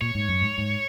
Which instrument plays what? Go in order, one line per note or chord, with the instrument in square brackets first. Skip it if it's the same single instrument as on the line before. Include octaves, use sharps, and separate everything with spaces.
[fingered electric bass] A#2 [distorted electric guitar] C#5
[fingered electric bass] G#2
F#2
G#2
G#2